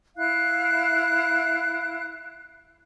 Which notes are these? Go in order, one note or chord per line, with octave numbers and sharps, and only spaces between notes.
E4 F5 F#6